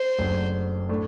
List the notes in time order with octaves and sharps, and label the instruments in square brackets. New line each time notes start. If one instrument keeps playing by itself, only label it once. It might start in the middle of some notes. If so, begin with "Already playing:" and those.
Already playing: [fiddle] C5
[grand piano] F#1 F#2 F#3 A3 D4
A2 A3 D4